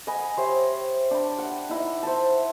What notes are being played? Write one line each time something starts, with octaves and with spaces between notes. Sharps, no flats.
D#5 F#5 G#5 B5
G4 C5 C#5 E5
D4 G5 B5
F#5
D#4 E4 D#5
C5 E5 A5